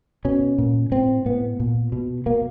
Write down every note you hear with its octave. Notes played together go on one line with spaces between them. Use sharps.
B2 C#4
A#2
A2 C4
A2 B3
A#2
B2
B2 A#3